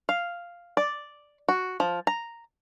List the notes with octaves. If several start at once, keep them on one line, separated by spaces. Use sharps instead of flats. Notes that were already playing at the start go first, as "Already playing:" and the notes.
F5
D5
F#4
F3
A#5